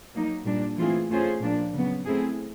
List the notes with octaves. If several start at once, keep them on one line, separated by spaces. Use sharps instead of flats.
F#3 A#3 D#4
A#2 G3 A#3 D4
E3 A3 C4 F4 G#4
A3 C#4 F4 G#4 C5
A#2 F3 A#3 D4
C#3 F#3 B3
A3 C4 E4 G#4